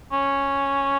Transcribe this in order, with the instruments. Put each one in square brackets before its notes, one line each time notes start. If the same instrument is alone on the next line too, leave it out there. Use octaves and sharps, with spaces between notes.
[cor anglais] C#4